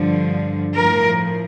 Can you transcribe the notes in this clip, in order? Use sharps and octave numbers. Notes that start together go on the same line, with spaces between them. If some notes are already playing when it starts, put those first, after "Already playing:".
Already playing: G2 D3 F3
A2 F3 A#4